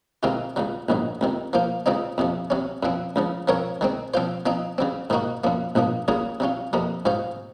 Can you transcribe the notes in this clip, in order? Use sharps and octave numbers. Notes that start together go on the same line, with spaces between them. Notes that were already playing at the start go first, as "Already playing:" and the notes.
C3 D#3 G#3 C4 F4
C#2 C#3 F#3
A#1 G#2 D#3 F#3
C#2 C3 D#3
F3 A#3 F4 C5
C#2 C#3 F#3 C4 D#4
F2 C3 F3
C3 F#3 C#4
F#2 F3 C4
C#2 C#3 F3
F3 C4 F4 A#4 C#5
D#3 G#3 C4
F3 C4 F4 C5
F3 C4 D#4
C#3 F#3 C4
G#2 D#3 A#3 D#4 F#4
F#2 F3 A#3
A#1 G#2 F3 A#3
C#3 F#3 A#3 F4 G#4
C3 F#3 C#4 F4
F2 C3 F3 A#3
G#2 F#3 C#4 F4 C5